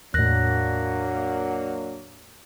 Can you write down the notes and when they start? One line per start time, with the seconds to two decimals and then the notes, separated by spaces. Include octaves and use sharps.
0.14 E2 A2 F#3 A#3 D4 F#6 A#6